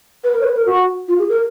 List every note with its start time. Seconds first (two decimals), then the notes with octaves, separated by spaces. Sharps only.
0.24 B4
0.34 A#4
0.41 C#5
0.45 B4
0.56 A#4
0.66 F#4
1.08 F4
1.19 G#4
1.29 A#4